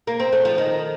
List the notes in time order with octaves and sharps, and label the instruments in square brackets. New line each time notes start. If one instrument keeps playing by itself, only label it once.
[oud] A#3
C4
A3
F3
D#3